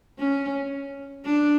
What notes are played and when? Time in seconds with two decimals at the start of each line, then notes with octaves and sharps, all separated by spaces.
0.19 C#4
1.25 D4